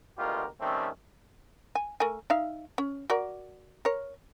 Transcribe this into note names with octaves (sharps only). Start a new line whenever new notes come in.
D2 B2 G#3 F4 G4 A#4
D#3 G3 A3 C4 C#4
G#5
A3 A#4 G#5
D#4 E5 F5
C#4
F#4 A#4 D5
A#4 C#5